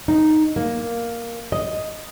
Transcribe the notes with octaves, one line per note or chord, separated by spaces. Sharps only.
D#4
A#3
D#5